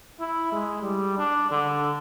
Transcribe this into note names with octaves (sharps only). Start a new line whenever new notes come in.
E4
G#3
G3
D4
D3